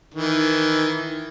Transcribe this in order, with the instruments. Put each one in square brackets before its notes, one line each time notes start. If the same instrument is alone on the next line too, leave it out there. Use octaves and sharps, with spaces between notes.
[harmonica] D#3 E3